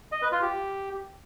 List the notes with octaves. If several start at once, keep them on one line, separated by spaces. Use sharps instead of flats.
D#5
B4
F4
G4